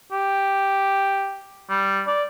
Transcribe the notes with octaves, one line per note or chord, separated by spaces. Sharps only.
G4
G3
D5